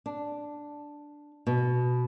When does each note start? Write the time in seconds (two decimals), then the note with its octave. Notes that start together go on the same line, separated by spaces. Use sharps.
0.06 D4
1.47 B2